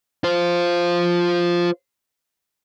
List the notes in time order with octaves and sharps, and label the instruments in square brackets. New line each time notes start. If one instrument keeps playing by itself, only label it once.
[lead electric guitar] F4 C5